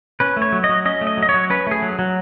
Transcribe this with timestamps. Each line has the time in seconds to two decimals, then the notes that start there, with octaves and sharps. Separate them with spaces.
0.20 C#4 B4
0.37 A3
0.42 C#5
0.52 F#3
0.64 D#5
0.69 F#3
0.85 C#4 D#5
1.01 A3
1.07 D#5
1.17 F#3
1.23 D#5
1.29 C#5
1.34 F#3
1.50 C#4 B4
1.67 A3 G#4
1.82 F#3
1.99 F#3